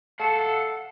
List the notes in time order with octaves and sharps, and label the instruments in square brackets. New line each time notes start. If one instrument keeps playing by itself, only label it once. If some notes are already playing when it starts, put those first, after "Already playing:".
[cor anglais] A4 [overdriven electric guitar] F5 F#5